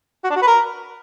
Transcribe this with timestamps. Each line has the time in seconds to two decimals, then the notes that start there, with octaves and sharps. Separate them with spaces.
0.24 F#4
0.30 D4
0.36 F#4
0.42 B4
0.47 A#4